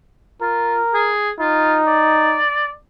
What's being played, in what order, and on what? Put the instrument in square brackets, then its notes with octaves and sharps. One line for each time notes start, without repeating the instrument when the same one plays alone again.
[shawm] F4 [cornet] A#4
[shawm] G#4
[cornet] D#4 [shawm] F4
[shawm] D5